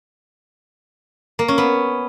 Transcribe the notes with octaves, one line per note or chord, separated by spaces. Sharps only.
A#3
C#4
B3